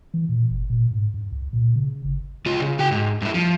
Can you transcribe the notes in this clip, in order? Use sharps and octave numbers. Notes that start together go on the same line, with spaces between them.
E3
A#2
F#1
A#2
G#2
G2
C2
A#2
C#3
G#1
C#2 F4
C#3
F#4 G5
G#2
G2 E4
F3